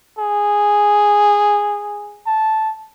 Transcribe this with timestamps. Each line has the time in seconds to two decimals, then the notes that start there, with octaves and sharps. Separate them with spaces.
0.18 G#4
2.26 A5